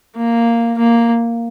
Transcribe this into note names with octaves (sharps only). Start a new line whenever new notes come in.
A#3
A#3